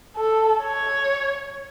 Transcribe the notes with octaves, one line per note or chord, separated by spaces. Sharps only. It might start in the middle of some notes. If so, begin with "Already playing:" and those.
A4
C#5